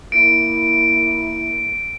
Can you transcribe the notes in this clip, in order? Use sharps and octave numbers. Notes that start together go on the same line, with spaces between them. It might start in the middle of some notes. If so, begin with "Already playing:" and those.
A#3 E4 D7